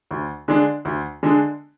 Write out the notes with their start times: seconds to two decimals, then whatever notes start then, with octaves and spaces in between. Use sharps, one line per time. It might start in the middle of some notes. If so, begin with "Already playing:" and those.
0.11 D2
0.48 D3 G#3 D4
0.85 D2
1.23 D3 G#3 D4